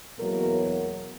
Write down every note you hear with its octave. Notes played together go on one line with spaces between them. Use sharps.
E2 B2 F#3 A#3 A#4